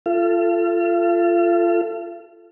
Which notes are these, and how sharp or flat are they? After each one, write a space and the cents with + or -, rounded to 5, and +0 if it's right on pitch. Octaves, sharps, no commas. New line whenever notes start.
F4 -15 A4 +0 F5 -45